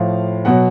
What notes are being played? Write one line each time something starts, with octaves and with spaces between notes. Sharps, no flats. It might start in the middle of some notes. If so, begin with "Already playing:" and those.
Already playing: A2 F3 F5
B2 F#3 F#5